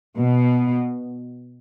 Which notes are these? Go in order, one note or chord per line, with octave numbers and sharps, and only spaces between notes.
B2